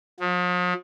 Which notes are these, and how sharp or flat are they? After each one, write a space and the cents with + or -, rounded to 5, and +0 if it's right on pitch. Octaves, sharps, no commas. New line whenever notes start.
F3 +45